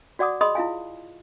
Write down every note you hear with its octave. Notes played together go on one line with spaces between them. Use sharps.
F#4 D5 F#5 D6 D#6
G#4 D#5 B5 C6 D#6
E4 F4 F5 G#5